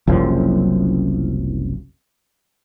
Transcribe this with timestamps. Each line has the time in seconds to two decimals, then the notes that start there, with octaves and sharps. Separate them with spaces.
0.07 F#1 C2 F#2 F3